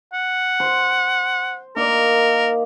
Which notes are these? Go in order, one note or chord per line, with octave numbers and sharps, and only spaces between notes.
F#5
C5
A#3 D#4 A#4